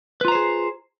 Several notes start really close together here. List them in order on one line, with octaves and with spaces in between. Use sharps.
B4 F4 A#5 C5 G#4